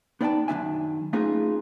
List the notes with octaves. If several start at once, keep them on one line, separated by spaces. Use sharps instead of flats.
B3 D#4 D5 F#5 G5 A5
F#2 D#3 E3 D4 E5 G#5
A3 C#4 D#4 F4 G#4 B4